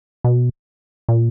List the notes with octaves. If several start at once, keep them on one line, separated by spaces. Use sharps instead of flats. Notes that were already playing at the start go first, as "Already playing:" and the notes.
B2
A#2